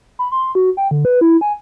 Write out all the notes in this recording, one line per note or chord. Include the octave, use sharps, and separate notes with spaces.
B5
C6
F#4
G5
D3
B4
E4
G#5